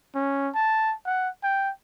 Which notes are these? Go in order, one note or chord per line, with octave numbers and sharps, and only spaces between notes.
C#4
A5
F#5
G5